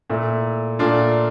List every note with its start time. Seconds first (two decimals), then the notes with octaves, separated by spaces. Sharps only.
0.10 A#2 A3 E4
0.79 A#2 A3 D4 F4